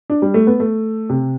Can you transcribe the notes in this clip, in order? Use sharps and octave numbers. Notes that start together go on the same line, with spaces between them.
D4
G3
A3
B3
A3
C3